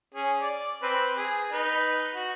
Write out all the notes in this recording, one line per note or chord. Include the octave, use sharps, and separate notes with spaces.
C#4 G#4
D5
C4 B4
G#4
D#4 B4
F#4